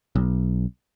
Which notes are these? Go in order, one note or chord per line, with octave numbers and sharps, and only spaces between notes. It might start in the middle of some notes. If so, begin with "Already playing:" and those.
B1